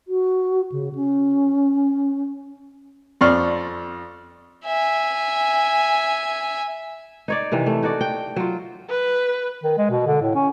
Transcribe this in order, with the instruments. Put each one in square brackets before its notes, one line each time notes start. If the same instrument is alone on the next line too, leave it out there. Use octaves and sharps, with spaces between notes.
[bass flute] F#4
C#3
C#4
[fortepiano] F2 D5 C6 C#6 F6
[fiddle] E5 G#5
[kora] D#4 C#5 D5
C3 D#3 E3
A3
D#4 F#4 C#5 D5
G5
F#3 F4
[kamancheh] B4
[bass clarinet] D#3
G#3
B2
D3
A2
C#4